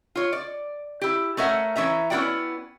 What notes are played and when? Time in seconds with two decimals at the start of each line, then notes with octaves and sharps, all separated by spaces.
0.15 F4 C#5
0.33 D5
1.01 E4 G4
1.37 A3 C#4 A#4 E5 F#5
1.76 E3 C4 C#4 E5 A#5
2.10 B3 C#4 E4 F#4 D5 G5